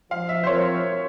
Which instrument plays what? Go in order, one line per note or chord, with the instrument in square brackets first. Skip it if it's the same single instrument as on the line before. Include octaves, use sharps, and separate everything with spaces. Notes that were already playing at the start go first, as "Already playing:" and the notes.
[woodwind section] F3 [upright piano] F5
[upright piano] E5
C5
[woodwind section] C4 F4 A#4 [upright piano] C#5